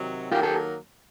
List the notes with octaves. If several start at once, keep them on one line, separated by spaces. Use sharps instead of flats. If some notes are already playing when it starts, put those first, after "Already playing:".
Already playing: C3 D#3 F#3
D#3 F#3 A#3 F4 G4
G4 A4